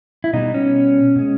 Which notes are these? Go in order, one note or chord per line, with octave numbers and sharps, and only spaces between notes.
E4
B2 G3 D#4
C#4
B2 G#3